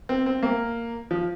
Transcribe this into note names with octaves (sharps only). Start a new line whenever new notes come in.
C4
C4
A#3
F3